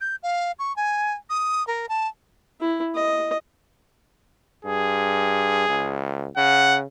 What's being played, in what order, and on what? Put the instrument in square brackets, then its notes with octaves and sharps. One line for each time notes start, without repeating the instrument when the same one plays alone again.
[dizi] G6
F5
C#6
G#5
D#6
A#4
A5
[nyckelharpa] E4
D#5
[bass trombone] G2 [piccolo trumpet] G#4
[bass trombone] C#2
[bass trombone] C#3 [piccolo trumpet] F#5